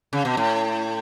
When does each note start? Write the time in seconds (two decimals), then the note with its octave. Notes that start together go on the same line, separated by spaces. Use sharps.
0.13 C#3
0.25 B2
0.37 A2